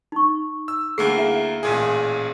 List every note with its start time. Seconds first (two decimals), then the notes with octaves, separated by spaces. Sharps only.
0.12 D#4 C#6
0.68 E6
0.98 D2 A#3 G#4 C7
1.16 E4 E5 F5
1.63 A1 A#2 G#4